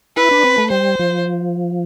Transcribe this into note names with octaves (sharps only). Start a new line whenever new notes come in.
E4 B4
D4
C4
A3
G3 C5
F3